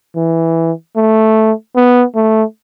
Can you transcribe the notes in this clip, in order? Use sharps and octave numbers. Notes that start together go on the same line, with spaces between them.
E3
A3
B3
A3